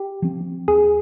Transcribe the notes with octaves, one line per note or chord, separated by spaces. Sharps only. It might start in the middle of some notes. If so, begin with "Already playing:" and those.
Already playing: G4
F3 C4
D#2 G#4